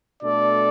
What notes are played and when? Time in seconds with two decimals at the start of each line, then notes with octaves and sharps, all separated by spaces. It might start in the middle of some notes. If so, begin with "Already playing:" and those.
0.23 B2 A3 D4 A4 D5